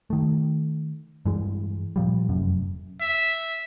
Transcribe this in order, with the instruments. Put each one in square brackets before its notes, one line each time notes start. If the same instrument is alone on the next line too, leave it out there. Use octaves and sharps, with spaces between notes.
[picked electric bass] D#3 A3
G2 E3 G#3
A#2 F3 G3
F1 F#2
[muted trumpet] E5